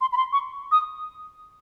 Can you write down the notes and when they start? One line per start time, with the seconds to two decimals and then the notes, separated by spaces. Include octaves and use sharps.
0.01 C6
0.12 B5
0.17 C6
0.33 C#6
0.72 D#6